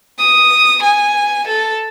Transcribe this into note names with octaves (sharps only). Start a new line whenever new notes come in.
D#6
G#5
A4